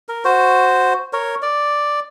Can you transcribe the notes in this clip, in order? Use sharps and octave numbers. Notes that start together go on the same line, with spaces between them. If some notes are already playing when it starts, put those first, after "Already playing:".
A#4
F#4 C5
A#4 C#5
D5